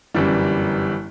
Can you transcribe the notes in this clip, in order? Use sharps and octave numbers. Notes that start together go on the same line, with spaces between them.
G1 F#2 E3 G3